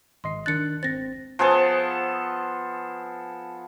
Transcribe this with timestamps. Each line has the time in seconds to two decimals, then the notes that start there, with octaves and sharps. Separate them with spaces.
0.24 G#1 D#5 C6 C7
0.46 D#3 D4 F#6 A6 C#7
0.83 G#1 C4 C5 A6 A#6
1.39 F3 B3 G#4 A4